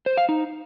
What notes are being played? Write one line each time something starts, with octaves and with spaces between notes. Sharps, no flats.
C5
F5
D#4